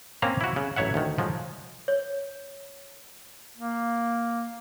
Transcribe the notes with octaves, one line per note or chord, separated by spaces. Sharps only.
A#3 C4 C#4 A#5
E4 F#4
C#3
A1 F#3 C#5 E5 F#5
D2 D#3
F3 F#3 G#3
C#5
A#3